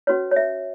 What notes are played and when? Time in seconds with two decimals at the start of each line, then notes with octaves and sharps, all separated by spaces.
0.07 C#4 F#4 B4 C#5
0.31 C#5
0.36 E5